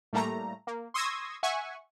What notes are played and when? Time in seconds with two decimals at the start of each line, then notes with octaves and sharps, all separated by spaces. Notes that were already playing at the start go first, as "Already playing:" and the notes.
0.13 A2 G3 A3 A#3 A#5
0.67 A#3
0.94 C6 C#6 D#6 E6 G#6 A#6
1.43 E5 F#5 G#5 C#6